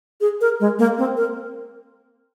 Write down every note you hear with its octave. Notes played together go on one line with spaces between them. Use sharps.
G#4
A#4
G#3
A#3
C4
A#4